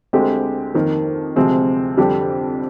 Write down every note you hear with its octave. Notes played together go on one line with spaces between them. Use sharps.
D2 D3 G#3 C4 G4
F2 D#3 A#3
D2 C3 F3 G#3 C4
F2 D3 G3 D4 G4